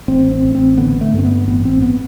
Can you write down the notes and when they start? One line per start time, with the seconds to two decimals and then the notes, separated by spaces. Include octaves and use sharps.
0.08 A1 C4
0.32 C4
0.43 A1
0.55 C4
0.78 D3 B3
1.01 A3
1.13 G2
1.18 C4
1.25 B3
1.48 A1 B3
1.65 C4
1.82 B3